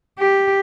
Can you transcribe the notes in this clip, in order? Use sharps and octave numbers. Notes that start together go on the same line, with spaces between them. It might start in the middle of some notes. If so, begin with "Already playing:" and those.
G4